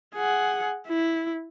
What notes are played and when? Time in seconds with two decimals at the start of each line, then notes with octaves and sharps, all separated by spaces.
0.15 G#4 F#5
0.88 E4